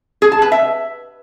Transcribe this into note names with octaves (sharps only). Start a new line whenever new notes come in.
G#4
A5
B4
E5